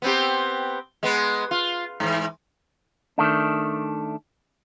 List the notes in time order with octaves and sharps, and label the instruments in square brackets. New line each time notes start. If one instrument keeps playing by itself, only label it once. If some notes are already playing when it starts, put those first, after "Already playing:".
[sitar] B3 C4 G4
G#3 B3
F4
G#2 E3
[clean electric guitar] D#3 A3 D4